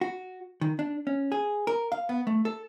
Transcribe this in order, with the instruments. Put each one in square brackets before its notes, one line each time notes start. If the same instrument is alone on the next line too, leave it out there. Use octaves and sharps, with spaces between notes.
[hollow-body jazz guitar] F#4
D#3
D4
C#4
G#4
A#4
F5
B3
A3
A4